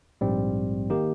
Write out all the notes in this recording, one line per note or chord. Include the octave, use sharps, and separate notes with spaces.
A#1 G#2 G3 C4
D#3 A#3 D#4 G4